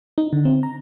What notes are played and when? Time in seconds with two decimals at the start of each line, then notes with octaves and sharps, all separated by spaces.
0.18 D#4
0.33 D3
0.45 C4
0.63 A#5